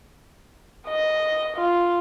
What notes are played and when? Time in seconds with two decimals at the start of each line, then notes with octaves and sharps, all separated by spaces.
0.88 D#5
1.57 F4